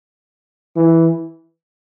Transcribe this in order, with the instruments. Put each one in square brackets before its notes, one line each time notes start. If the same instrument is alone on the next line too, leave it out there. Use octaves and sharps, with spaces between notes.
[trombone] E3